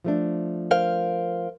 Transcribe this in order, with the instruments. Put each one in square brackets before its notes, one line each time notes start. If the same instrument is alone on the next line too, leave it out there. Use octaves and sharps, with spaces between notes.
[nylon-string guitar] F3 A3 D4
[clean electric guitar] A#4 C5 F5